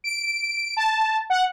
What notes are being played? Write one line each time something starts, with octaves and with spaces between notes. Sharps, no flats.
D7
A5
F#5